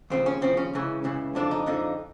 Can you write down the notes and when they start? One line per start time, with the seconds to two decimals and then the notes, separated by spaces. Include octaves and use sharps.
0.10 D#2 C#3 F3 C4
0.26 C#4
0.41 D#2 C#3 F3 C4
0.57 C#4
0.73 C#2 C#3 E3
1.04 C#2 C#3 E3
1.35 F2 D3 F3 D4
1.51 D#4
1.66 F2 D3 F3 D#4